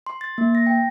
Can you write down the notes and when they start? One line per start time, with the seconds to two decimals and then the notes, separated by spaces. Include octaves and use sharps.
0.07 C6
0.21 A6
0.38 A#3
0.55 A#6
0.67 G5